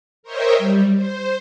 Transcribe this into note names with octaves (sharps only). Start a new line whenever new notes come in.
A#4 C5 C#5 D#5 E5 G5
G3
C5